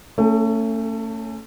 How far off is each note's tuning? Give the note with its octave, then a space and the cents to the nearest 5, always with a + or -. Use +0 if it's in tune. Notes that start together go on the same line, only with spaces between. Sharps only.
A3 +30 C#4 +0 A4 -20